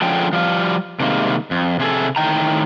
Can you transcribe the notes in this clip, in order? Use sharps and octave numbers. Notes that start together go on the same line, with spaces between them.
D3 F3 G#3 C#4 A4 G5
F3 G3 F5
C3 D#3 G3 G#3 A#3
F2
C3 G#4 A4
A2 D#3 G5 A#5